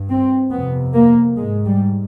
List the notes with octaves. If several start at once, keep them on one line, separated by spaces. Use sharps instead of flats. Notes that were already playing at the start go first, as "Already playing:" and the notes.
Already playing: G2
C4
F2 C3 B3
A#3
G#2 G#3
G3